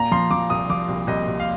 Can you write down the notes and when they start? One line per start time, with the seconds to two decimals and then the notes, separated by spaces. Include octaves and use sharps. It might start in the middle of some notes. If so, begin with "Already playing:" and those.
Already playing: A#2 A#5
0.11 F3 C6
0.31 F3 D6
0.50 C2 D#6
0.70 F3 D6
0.89 C2
1.07 C2 D#5
1.28 C2
1.40 F5